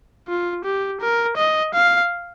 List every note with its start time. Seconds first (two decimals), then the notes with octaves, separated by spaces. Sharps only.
0.28 F4
0.64 G4
1.01 A#4
1.37 D#5
1.74 F5